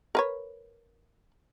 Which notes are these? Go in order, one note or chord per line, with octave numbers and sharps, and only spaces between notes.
A#4 B4 C#5